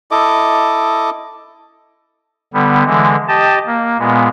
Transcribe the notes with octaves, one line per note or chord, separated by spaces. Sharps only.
E4 A4 D#5 D6
D3 G3 B3
D3 E3 G#3
G4 D#5 A5
A#3
A#2 G#3 B3